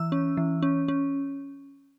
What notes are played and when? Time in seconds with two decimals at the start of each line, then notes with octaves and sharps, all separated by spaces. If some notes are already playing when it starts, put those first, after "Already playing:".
Already playing: E3 E6
0.12 C#4
0.37 E3
0.62 C#4
0.88 C#4